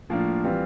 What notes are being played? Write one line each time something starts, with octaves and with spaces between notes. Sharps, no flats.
A2 F3 A#3 D4 F4
E3 G3 C4 F4